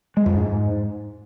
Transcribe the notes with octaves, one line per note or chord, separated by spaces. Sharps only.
G#3
F2
G#2